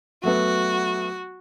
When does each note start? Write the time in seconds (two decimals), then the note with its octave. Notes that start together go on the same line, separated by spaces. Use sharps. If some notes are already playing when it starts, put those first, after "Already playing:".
0.24 F#3 A3 B3 F#4